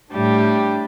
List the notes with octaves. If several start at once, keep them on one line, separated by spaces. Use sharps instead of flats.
A2 G3 D4 G4